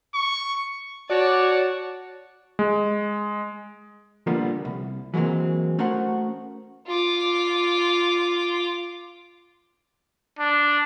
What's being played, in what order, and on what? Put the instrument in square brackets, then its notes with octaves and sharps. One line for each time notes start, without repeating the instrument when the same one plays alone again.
[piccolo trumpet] C#6
[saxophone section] F#4 [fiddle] C#5 A5 [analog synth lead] D5
[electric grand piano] G#3
[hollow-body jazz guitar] A#2 D3 F3 G3 A#3 B3
C2
E3 F#3 G#3 A#3 C4
A3 C#4 F#4 A#4 C5 F#5
[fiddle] F4 D6
[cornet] D4